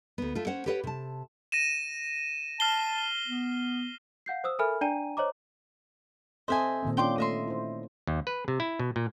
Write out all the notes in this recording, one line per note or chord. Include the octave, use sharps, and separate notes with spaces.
D2 B3
A3 F4
C#4 C5 F#5
G4 A4 B4 C#5 F#5
C3 A5
A#6 D#7 E7
A5 F6 C7 G7
B3
F5 F#5 G6 C7
C5 D#6 E6
A4 A#4 E5 G#5 B5 F6
D4 D5 G5 G#5 A#5 D#7
C5 C#5 D#5 A#5 D6
C4 A4 C5 D#5 E5 G#5
A#2 D#3 C4
C#4 D4 F4 G5 C6 D6
A3 D#5 E5 C6
E4 C5
D#2
B4
C3
E4
B2
A#2